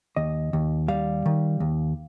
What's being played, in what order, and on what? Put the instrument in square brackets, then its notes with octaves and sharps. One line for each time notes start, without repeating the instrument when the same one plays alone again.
[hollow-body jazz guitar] D#2 D#5
D#2
G3 F5
D#3
D#2